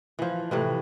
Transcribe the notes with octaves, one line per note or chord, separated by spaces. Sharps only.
E3 F3
A2 C3 E3